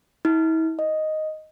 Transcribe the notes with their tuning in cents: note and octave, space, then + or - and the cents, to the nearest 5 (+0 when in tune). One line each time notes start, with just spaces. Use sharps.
E4 -40
D#5 +0